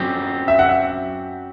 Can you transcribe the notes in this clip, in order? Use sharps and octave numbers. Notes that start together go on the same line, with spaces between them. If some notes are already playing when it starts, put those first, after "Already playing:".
Already playing: F#2 F#3 C4 G4
E5
F#5
E5